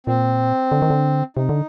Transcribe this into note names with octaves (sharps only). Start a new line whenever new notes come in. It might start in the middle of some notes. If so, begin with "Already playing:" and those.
A#2 C4
D3
D#3
D3
C3 D#4
D3